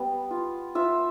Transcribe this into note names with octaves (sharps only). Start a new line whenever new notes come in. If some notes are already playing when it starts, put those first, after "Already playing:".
Already playing: G3 B3
F4
F4 E5